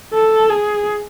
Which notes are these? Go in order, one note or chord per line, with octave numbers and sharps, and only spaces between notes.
A4
G#4